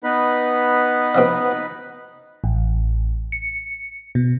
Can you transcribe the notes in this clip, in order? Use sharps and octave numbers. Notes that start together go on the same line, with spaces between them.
B3 D#4 B4 B5
B2 F3 D#5
A1
C#7
B2